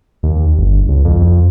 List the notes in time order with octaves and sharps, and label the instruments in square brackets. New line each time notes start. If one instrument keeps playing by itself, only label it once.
[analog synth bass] D#2
G1
C#2
F2